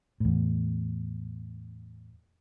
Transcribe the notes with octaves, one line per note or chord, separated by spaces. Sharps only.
E2 A2